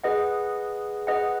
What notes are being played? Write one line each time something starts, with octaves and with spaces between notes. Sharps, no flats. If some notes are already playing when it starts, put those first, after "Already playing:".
G#4 B4 D#5 F#5
G#4 B4 D#5 F#5